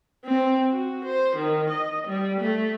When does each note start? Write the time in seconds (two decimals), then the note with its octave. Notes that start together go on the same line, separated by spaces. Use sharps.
0.25 C4
0.71 F#4
1.05 C5
1.36 D#3
1.70 D#5
2.07 G3
2.40 A3